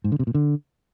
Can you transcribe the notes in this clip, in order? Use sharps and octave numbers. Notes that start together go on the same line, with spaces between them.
G#2
D3
C3
A#2
D3